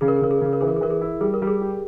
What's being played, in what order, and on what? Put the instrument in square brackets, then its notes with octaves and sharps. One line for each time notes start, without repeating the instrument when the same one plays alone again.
[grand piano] C#3 [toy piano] G#4
[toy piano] A#4
G#4
[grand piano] C#3 [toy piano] A#4
[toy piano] G#4
A#4
[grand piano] C#3 [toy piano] G#4
[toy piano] A#4
[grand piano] E3 [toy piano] G#4
[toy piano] A#4
G#4
[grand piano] E3 [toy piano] A#4
[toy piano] G#4
[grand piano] E4
[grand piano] G3 [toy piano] G#4
[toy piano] A#4
[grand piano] G3
[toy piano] G#4
[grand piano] G4